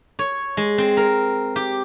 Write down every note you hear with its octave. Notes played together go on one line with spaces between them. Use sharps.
C#5
G#3
C4
A#4
G4